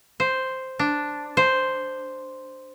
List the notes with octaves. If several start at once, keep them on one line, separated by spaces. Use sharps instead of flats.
C5
D4
C5